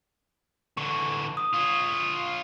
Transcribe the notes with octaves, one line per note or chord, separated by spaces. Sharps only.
D3 E3 C#6
D#6
F4 C#5